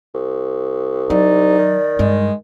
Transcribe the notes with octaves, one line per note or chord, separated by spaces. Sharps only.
C2
F#3 D#4 D5
D#3
G2 G#3